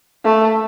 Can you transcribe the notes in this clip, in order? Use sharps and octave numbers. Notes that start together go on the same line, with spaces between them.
A3